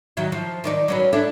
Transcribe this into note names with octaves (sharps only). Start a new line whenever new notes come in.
D#3 F#3 E4
F3
D#3 D#4 D5
F#3 C#4 B4
D4 E4 A4